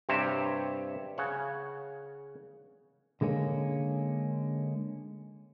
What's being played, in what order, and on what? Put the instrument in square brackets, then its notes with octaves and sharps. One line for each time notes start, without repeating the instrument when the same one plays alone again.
[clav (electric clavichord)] G2 C3 C4 G4 C#5 E5
C#3 C#5 F#5
[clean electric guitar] D3 G#3 A#3 C#4